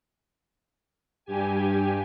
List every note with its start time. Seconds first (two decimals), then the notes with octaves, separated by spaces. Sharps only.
1.25 G2 G4 G#5